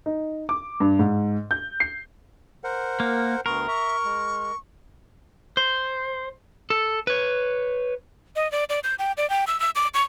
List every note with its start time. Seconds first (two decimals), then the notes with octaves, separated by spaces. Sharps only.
0.06 D#4
0.49 D6
0.80 G2
0.99 G#2
1.51 G6
1.80 C7
2.64 A#4 C5 F#5
3.00 A#3
3.46 D2 B3 A#4 C6 C#6
3.68 E5 C#6
4.05 G#3
5.57 C5
6.70 A4
7.07 B4 C#5
8.36 D#5
8.52 D5
8.69 D5
8.84 G6
8.99 G5
9.17 D5
9.30 G5
9.47 E6
9.60 E6
9.76 D6
9.94 C#6